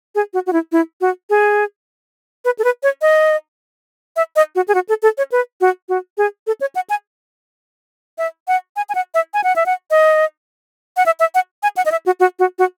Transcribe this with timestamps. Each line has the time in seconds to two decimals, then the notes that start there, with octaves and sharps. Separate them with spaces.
0.15 G#4
0.34 F#4
0.47 F#4
0.53 E4
0.72 E4
1.01 F#4
1.30 G#4
2.45 B4
2.59 A4
2.64 B4
2.83 C#5
3.02 D#5
4.16 E5
4.36 D#5
4.55 F#4
4.68 G#4
4.75 F#4
4.89 A4
5.02 A4
5.18 C#5
5.32 B4
5.61 F#4
5.89 F#4
6.18 G#4
6.47 A4
6.61 C#5
6.75 F#5
6.90 G#5
8.18 E5
8.48 F#5
8.76 G#5
8.89 G#5
8.95 F#5
9.14 E5
9.34 G#5
9.44 F#5
9.56 E5
9.66 F#5
9.91 D#5
10.97 F#5
11.06 E5
11.20 E5
11.35 F#5
11.63 G#5
11.77 F#5
11.86 D#5
11.92 E5
12.06 F#4
12.20 F#4
12.39 F#4
12.59 F#4